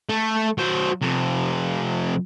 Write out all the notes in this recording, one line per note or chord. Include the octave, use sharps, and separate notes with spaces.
A3
F#3 C5
F2 C3